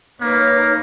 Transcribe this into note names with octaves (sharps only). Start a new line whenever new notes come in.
A#3 D#4 B4 C#5